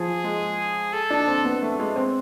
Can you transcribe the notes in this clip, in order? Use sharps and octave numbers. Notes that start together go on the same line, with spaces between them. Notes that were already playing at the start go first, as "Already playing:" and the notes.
Already playing: F3 G#4
G#3
A4
D4
C4
B3
A3
G#3
C4